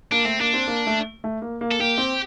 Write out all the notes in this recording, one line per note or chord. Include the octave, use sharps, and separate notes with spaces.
A#3 D4
A3 C4
A#3 D4
C4
A#3
A3
A3
A#3
A#3
A4
A#3 G4
C4